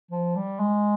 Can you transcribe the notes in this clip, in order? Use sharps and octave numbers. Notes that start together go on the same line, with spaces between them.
F3
G3
G#3